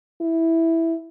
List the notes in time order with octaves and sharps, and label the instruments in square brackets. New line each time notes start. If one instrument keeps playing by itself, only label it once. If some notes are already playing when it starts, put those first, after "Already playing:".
[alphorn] E4